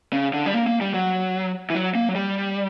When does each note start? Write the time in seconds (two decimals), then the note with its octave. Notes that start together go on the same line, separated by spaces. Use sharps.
0.13 C#3
0.34 D3
0.46 G3
0.54 A#3
0.67 A#3
0.81 G3
0.94 F#3
1.70 E3
1.75 F#3
1.95 A#3
2.09 F#3
2.15 G3